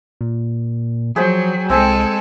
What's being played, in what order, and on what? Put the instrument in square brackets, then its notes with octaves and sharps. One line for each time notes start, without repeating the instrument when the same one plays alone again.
[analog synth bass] A#2
[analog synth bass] F3 [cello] F#3 [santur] G#4 C5 G5
[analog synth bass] C2 [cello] G#3 A4 [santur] C4 G#5